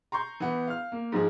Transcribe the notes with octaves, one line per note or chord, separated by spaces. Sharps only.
A#5 C6 C#6 G6
E3 B3
F5 F6
A#3
G#2 F3 G#4